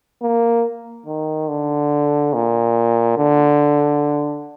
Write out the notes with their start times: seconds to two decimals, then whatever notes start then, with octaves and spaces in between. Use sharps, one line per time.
0.22 A#3
1.06 D#3
1.48 D3
2.34 A#2
3.17 D3